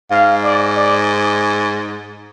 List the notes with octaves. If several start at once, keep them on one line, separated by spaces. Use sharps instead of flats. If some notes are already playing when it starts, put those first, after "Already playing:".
G#2 F5
D5
D5